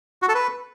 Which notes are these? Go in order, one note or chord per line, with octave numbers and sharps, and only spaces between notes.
F#4
A4
B4